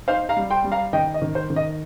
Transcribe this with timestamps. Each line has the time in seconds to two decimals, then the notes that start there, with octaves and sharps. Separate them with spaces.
0.08 D#4 C5 F5
0.29 F5 A#5
0.37 G3
0.50 G5 C6
0.64 G3
0.72 F5 A#5
0.93 D#3 D#5 G5
1.14 D#5
1.22 D#3
1.35 C5
1.50 D#3
1.56 D#5